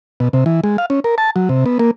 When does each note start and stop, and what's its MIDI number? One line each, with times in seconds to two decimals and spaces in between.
0.20 0.29 47
0.33 0.44 48
0.46 0.61 52
0.64 0.77 56
0.78 0.86 77
0.90 1.00 61
1.04 1.15 70
1.18 1.30 81
1.36 1.49 54
1.49 1.64 48
1.66 1.78 59
1.79 1.91 58